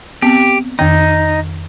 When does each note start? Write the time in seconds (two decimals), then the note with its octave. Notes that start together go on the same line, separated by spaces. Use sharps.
0.22 B3 C4 G4
0.79 F2 D#3 D#4 G5